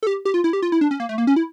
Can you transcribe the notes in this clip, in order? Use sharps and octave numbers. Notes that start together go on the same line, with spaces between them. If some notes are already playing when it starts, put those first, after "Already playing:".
A4
G4
G4
F4
E4
G4
F4
E4
D4
C#4
A#3
A3
A#3
C#4
E4